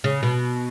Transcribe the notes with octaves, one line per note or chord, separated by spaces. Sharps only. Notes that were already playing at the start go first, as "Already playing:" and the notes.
C#3
B2